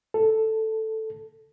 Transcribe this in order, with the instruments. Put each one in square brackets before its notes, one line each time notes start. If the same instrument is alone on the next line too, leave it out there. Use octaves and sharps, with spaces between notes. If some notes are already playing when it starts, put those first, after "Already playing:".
[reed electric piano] A4